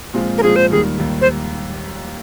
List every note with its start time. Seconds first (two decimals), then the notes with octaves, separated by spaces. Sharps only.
0.14 A#2 F3 G#3 C4 F4
0.38 A#4
0.42 A#2 F3 G#3 C4 F4 G#4
0.56 C5
0.70 D#2 D#3 G3 G#4
0.99 D#2 D#3 G3
1.21 C5